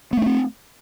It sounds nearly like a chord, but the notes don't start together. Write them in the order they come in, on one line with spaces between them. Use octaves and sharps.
B3 A3 D4 C4